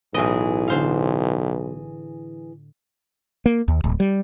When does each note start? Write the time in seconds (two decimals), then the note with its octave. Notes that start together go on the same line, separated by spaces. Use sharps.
0.14 B1 A2 E3 G#4 D#5
0.68 D3 C5 F5
3.46 A#3
3.68 D#2
3.84 D1
4.00 G3